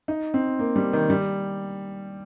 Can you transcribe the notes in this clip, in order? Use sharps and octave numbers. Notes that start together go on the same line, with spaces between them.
D#4
C4
A#3
G3
D#3
G3